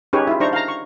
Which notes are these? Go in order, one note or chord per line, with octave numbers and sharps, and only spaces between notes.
C#4 D#4 G4 G#4 B4 C#5
E4 F4
D4 D#4 C5 A#5 C#6
F5 A#5
C#6